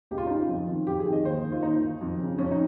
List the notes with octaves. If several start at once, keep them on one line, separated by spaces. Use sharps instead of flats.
C#2 G4
F4
C#3 D#4
F4
F2
D#3
F2 G4
G#4
D#3
D#5
D#2 C5
D#3
F4
D#2 D#4
D#3
F2
C#3
F2 C#4
D#4